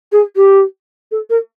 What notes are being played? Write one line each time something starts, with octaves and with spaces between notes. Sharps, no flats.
G#4
G4
A4
A#4